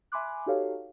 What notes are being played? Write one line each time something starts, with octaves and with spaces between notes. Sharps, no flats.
E5 G#5 B5 C6 D6 F#6
D#4 F#4 G4 A4 C#5 F5